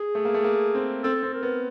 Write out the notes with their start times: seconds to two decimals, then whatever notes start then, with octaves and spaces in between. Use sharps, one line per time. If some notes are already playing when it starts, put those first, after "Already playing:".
Already playing: G#4
0.15 A3
0.25 A#3
0.34 A3
0.44 A#3
0.75 C4
1.03 C4 A4
1.23 C4
1.34 A#4
1.43 B3